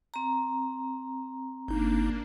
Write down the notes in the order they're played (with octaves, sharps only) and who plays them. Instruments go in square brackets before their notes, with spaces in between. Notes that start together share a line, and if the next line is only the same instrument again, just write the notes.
[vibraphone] C4 A#5
[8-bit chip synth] G1 D#4 [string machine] A#3 D4